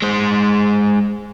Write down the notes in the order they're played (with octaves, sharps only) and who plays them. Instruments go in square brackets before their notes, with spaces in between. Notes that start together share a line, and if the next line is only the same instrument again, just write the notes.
[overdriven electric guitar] G#3 C5